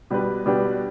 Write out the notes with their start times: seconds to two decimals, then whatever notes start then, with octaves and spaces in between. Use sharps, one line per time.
0.10 B2 G3 D4 G4 B4
0.46 B2 G3 D4 G4 B4